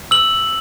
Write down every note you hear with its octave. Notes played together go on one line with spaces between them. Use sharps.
E6 F#7